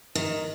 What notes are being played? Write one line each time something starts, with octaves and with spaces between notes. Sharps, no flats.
D#3